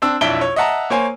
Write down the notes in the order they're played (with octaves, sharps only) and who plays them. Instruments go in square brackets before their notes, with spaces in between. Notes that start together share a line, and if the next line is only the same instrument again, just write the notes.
[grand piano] C4 D4 E6
B1 F2 D4 E4 D7 G7
C#5
D#5 E5 F#5 A5 A#5
A#3 C5 C#5 G#5